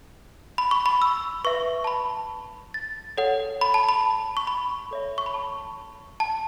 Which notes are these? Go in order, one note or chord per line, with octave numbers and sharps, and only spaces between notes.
B5
C#6
B5
E6
B4 E5 C#6
A5
B5
A6
A4 C#5 F#5
B5
A5
B5
C#6
B5
A4 C#5 E5
C#6
B5
A5
A5